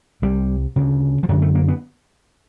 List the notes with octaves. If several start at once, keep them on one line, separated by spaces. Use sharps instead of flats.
C2 C3 G3
D2 C#3
F3
F#2 D3 F#3
A3
A#3
B3